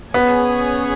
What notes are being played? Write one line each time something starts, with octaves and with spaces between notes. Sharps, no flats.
B3 C#4 G#4 C#5 G#5